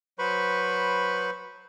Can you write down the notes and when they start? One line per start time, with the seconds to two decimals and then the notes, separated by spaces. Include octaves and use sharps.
0.19 F#3 B4 C5 B5 C#6